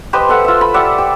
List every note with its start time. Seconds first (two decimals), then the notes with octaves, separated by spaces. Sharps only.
0.13 G4 B4 C5 D#5
0.29 A4 E5 F#5
0.44 F4 E5
0.61 B5
0.74 G4 D5 E5 F#5
0.98 G4